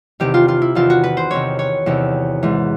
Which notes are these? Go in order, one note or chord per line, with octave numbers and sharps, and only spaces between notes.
E2 C3 D#3 G4
F4
F4
E4
E2 C3 D#3 F4
F#4
B4
C5
E2 C3 D#3 C#5
C#5
E2 C3 D#3
G#2 E3